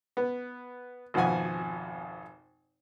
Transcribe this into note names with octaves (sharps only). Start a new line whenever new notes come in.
B3
G#1 F2 B2 F3 F#5 G#5